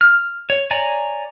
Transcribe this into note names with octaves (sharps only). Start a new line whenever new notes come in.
F6
C#5
C#5 D5 G#5 A#5